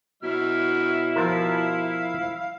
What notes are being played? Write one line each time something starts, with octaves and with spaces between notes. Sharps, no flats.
B2 F#3 E4 E5 F6
F3 F4 A#4 F5